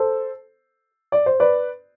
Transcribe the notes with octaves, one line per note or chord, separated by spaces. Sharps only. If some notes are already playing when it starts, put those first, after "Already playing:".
Already playing: A4 C5
D5
C5
B4 D5